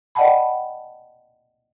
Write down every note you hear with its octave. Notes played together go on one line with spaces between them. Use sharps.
D5 D#5 F#5 G5 A5 B5